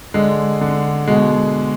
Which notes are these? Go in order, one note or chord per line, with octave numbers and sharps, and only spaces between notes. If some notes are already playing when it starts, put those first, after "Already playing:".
D3 G#3
D3
B2 G#3